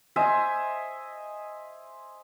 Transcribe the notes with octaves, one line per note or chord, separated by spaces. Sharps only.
C5 D#5 E5 G#5